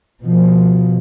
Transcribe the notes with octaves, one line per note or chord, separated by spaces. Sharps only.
B2 F3